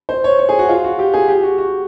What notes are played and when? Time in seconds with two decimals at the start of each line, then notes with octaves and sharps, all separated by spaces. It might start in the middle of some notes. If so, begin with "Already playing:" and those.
0.09 C5
0.24 C#5
0.39 C#5
0.49 G#4
0.59 F#4
0.69 F4
0.84 F#4
0.99 G4
1.14 G#4
1.28 G4
1.43 F#4
1.58 F#4